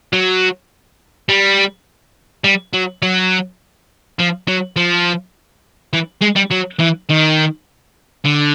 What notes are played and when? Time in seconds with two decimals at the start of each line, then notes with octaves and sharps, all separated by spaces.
0.13 F#3
1.29 G3
2.44 G3
2.73 F#3
3.02 F#3
4.19 F3
4.48 F#3
4.76 F3
5.93 E3
6.22 G#3
6.36 G3
6.51 F#3
6.80 E3
7.09 D#3
8.25 D3